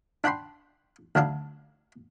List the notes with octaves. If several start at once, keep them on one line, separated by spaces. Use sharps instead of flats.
D4 F#5 G5 B5 C6
D2 F#3 D4 F5